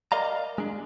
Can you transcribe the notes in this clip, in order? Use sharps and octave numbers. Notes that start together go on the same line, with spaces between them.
A#4 D5 D#5 F5 A#5
G#3 D4